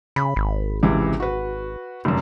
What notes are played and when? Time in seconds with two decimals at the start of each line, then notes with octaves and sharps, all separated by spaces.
0.16 C#3 B5
0.36 G#1
0.83 C#2 C3 E3
1.20 F#4 B4
2.05 F1 F#2